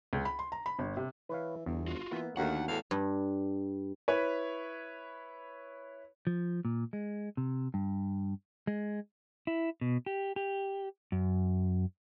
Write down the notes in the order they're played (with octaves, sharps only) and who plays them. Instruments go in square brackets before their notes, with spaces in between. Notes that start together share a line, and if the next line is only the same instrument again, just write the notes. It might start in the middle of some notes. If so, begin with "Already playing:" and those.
[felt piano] C#2
B5
C6
A#5
B5
G1
C3
[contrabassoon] E3 [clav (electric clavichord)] B4 C#5 F5
[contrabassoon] G1 [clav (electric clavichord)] E2
[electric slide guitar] F4 F#4
[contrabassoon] E3 [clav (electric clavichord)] A#3 B3 E5
[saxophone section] D#2 [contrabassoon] D3 [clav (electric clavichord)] A3 F#4 [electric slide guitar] F#5
[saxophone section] E2 A2 F5
[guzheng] G2
[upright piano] E4 B4 C#5
[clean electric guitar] F3
A#2
G#3
C3
G2
G#3
[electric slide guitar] E4
B2
G4
G4
F#2